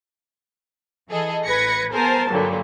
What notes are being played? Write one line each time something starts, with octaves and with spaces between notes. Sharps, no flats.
E3 G#4 A4 D#5
A1 B4 G#6 A#6 B6 C#7
B3 G#4 A#4 C5 G#5 A5
G2 A#2 D3 F#3 G3